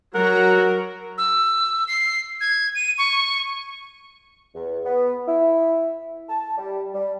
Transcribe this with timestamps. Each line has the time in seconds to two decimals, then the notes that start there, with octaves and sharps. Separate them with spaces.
0.15 F#3 F#4 A#4 F#5 A#5
1.18 E6
1.88 C7
2.41 G#6
2.75 D#7
2.98 C#6
4.54 E2
4.85 B3
5.27 E4
6.29 A5
6.58 G3
6.94 G3